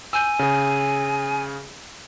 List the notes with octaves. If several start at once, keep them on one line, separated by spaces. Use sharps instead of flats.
G#5 E6 G6
C#3 G#4